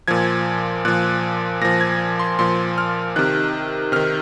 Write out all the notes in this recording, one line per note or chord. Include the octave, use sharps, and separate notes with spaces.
A#2 F3 G#6
A#2 F3 F#6
A#2 F3 A#6
G#6
C6
A#2 F3 C6
F6
C3 D#3 F#6
C3 D#3 F6